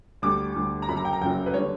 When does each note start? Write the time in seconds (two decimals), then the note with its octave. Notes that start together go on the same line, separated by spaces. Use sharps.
0.22 D2 D3 G3 D6
0.56 D2 D3 G3
0.82 A#5
0.88 F#2 C#3 F#3 B5
0.97 A#5
1.05 G5
1.13 A#5
1.21 F#2 C#3 F#3 G5
1.46 B4
1.54 D3 G3 C#5